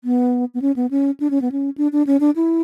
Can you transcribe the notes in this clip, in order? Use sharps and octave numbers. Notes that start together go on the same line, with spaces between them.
B3
B3
C#4
B3
C#4
D4
C#4
B3
C#4
D4
D4
C#4
D4
E4